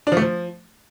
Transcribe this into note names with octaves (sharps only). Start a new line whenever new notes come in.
D4
F3
A3
F3